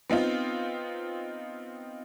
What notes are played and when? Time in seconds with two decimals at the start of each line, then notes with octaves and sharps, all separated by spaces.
0.10 B3 C4 D#4 F4